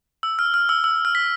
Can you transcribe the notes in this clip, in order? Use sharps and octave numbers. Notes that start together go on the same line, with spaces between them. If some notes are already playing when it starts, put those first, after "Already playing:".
E6
F6
F6
E6
E6
F6
B6